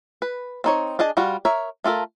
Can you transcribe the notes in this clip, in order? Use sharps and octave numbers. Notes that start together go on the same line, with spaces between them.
B4
C4 D#4 C#5
D4 G#4 D#5 A5
G3 F4 F#4
A#4 C#5 E5
A3 F4 A4 A#4